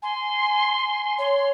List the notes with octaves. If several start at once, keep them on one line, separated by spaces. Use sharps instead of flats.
G#5 C6
C#5 C6